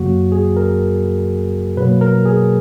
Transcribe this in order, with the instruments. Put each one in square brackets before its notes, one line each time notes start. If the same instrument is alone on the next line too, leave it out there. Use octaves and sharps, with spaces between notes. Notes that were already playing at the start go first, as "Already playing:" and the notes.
Already playing: [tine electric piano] F#2 C#3 F#3 A#3 F#4
G#4
A#4
B2 F#3 A#3 B4
A#4
G#4